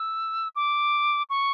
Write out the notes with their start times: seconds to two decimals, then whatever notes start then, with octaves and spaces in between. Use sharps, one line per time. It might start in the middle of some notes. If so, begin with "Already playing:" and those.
Already playing: E6
0.56 D6
1.30 C#6